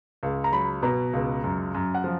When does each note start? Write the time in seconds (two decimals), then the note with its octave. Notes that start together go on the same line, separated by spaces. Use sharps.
0.23 C#2
0.44 A#5
0.52 F#3 B5
0.83 B2 A#5
1.13 C#2
1.44 F#2
1.74 F#2
1.95 F#5
2.04 F3